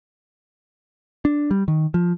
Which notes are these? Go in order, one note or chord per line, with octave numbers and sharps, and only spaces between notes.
D4
G3
D#3
F3